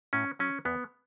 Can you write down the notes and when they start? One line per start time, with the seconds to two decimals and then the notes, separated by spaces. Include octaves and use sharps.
0.13 A2 C#4
0.39 F#3 C#4
0.65 E2 B3